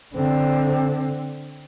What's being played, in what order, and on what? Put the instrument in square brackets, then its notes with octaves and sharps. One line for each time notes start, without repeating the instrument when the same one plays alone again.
[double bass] D3 C4